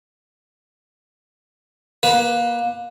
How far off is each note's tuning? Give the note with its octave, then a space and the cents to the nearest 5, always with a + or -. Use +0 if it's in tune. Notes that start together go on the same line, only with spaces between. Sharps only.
A#3 +25 B4 +0